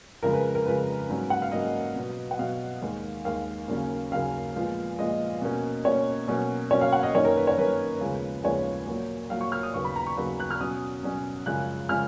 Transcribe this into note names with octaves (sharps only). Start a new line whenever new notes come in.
F2 C#3 G#3 A#4
B4
A#4
F2 C#3 G#3 B4
G#2 F#3 A#3 C#4
F#5
F5
G#2 F#3 A#3 C#4 D#5
B2 F#3 B3
F#5
B2 F#3 B3 F5
D#2 D#3 G#3
D#2 D#3 G#3 F5
D#2 C#3 F#3 A#3 C#4
D#2 C#3 F#3 A#3 C#4 F5
A#2 F3 G#3 B3
A#2 F3 G#3 B3 D#5
B2 A#3 C#4
B2 A#3 C#4 C#5
B2 F#3 A#3 C#4
B2 F#3 A#3 C#4 C#5
F5
F#5
D#5
F#2 D#3 A#3 C#4 C#5
A#4
B4
C#5
F#2 D#3 A#3 C#4 B4
D#2 C#3 F3 G#3 B3
D#2 C#3 F3 G#3 B3 C#5
A#2 F#3 A#3
A#2 F#3 A#3 F5
C#6
F6
D#6
D#2 C#3 F#3 B3 C#6
B5
A#5
C#6
D#2 C#3 F#3 B3
F#6
F6
B2 F#3 C#4 D#6
B2 F#3 C#4
F#2 C#3 F3 G#3 C#4 F#6
C#3 F3 G#3 C#4 F6